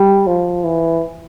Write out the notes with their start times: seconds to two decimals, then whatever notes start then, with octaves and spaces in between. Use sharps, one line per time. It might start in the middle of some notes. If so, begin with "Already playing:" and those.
Already playing: G3
0.27 F3
0.64 E3